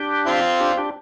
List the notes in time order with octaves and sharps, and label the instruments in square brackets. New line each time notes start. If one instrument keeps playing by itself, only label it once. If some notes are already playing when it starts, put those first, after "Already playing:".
Already playing: [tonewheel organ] D4 G4
[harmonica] C4 F4
[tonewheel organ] D4 G4
D4 G4